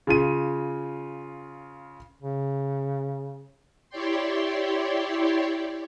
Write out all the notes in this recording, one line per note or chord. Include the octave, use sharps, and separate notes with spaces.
C#3 F4 D#7
C#3
E4 G4 C#5 D5 G5 C6